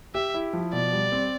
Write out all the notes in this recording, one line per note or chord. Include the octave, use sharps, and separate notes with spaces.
G4 E5
E4
F3
B2 D5
G3
C4